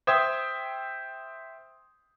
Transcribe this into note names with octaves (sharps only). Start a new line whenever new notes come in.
C5 E5 G5 D#6 G#6